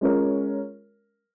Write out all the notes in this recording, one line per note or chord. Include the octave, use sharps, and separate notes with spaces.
G#3 C#4 F4 A#4 C#5